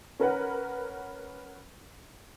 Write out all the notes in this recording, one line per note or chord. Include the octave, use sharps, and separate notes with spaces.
C#4 A#4 B4 F#5